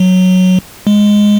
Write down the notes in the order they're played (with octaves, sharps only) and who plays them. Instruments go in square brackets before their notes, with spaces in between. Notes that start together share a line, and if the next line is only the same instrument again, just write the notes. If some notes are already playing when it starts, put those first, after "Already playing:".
Already playing: [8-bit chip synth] F#3
G#3